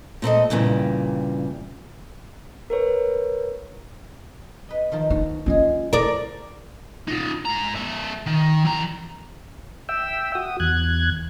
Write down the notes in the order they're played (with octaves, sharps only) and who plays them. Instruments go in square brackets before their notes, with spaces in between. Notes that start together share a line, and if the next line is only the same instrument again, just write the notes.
[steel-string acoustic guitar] A#2 C4 A4 D#5
G2 A#2 C#3 E3 G3
[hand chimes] A#4 B4 C#5
[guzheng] B4 D#5
D#3 F3 D#4
[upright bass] D#4 [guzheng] F#4
[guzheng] G#3 G#4 [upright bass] C#4 F4
[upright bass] E4 [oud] A#4 D5
[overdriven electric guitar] D#4 F4
G#2 A#5
G#3 E5
D#3
E3 A#5
[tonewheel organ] E5 G5 E6
F#4 D#6
E2 F#6 G#6